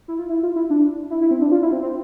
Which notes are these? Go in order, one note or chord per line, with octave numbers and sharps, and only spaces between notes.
E4
F4
E4
F4
E4
D4
E4
E4
C4
D4
F4
E4
C4
C4